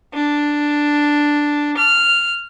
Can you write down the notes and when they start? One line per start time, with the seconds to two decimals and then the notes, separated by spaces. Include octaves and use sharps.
0.12 D4
1.76 F6